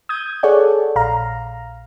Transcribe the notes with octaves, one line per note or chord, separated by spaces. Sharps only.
D#6 G6 G#6
G#4 A4 C#5 D5 F#5
A#1 F5 A#5